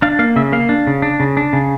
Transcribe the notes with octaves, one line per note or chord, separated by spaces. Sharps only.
D4 F5
A#3 F5
C#3 E5
A#3 F5
D4
C#3
D4
C#3
D4
C#3